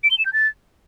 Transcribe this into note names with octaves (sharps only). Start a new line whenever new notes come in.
D7
G7
E7
G6
A6